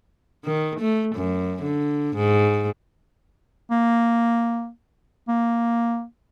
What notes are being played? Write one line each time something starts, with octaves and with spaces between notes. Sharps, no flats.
D#3
A3
F#2
D3
G#2
A#3
A#3